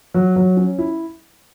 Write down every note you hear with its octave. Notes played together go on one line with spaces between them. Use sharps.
F#3
F#3
C#4
E4